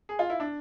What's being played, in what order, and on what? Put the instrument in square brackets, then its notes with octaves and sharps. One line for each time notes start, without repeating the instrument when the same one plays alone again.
[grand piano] G#4
F4
E4
D4